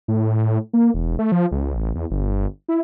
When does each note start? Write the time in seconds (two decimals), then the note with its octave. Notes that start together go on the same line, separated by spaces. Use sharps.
0.08 A2
0.73 A#3
0.94 E1
1.19 A3
1.32 F3
1.52 C#2
1.75 A1
1.95 E2
2.11 G1
2.68 E4